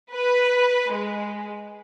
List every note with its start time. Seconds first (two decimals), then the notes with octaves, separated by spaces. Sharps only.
0.13 B4
0.93 G#3